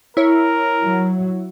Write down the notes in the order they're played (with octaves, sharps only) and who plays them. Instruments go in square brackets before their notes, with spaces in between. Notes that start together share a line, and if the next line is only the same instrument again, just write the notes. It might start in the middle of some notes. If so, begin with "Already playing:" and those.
[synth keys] E4 C#5 [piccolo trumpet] A#4
[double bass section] F#3